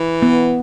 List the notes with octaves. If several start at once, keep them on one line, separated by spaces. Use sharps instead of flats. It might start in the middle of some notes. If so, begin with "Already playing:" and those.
Already playing: E3
B3